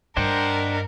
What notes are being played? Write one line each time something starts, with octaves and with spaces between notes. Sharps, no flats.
G2 D4 A#4 C5 D#5 F#5 G5